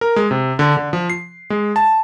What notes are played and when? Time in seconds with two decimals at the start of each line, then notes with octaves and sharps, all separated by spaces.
0.01 A#4
0.16 G#3
0.31 C3
0.59 D3
0.77 D3
0.93 F3
1.10 C7
1.50 G#3
1.76 A5